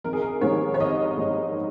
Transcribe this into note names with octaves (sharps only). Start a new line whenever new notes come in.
G#1 A#4
G#4
A#4
G#2 D#3 G3 C#5
C#5
G#1 D#5
G#2 D#3 G3